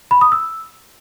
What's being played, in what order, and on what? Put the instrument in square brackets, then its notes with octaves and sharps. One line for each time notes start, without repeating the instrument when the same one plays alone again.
[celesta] B5
D#6
E6